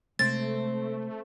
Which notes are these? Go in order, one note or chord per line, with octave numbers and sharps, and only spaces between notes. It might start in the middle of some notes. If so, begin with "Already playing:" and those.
C3 G#3 A3 C4 A6